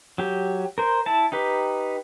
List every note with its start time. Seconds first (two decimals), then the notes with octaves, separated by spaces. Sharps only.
0.18 F#3 G4
0.78 A#4 C5
1.06 E4 A5
1.32 D#4 G4 B4